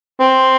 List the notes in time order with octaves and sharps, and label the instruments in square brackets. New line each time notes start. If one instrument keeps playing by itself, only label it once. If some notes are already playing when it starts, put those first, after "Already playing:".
[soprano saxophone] C4